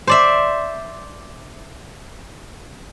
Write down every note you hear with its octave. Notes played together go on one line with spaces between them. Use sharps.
C5 D5 E5